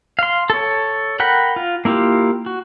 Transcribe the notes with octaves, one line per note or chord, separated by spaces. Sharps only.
F5 C6
A4 C#5
A#4 F#5 G5 B5
F4
A#3 E4 F4 G4
F#4